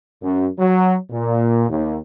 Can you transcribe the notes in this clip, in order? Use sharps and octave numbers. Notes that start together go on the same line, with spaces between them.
F#2
F#3
A#2
D#2